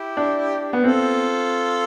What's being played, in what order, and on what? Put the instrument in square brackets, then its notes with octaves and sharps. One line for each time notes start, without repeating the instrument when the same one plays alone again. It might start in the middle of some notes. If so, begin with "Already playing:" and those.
Already playing: [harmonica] E4 G4
[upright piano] D4
B3
[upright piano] C4 [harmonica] F4 A4